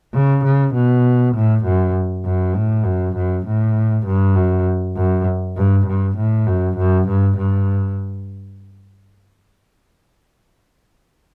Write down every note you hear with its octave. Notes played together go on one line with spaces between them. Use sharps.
C#3
C#3
B2
A2
F#2
F#2
A2
F#2
F#2
A2
G2
F#2
F#2
G2
G2
A2
F#2
F#2
G2
G2